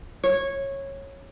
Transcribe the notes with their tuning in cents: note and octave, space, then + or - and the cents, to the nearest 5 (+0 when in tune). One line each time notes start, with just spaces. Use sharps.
C#5 -15